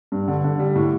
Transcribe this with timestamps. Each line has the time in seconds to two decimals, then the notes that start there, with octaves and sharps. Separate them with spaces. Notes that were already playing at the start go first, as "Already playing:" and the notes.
0.12 G2
0.28 D3
0.44 D3
0.59 G3
0.76 A2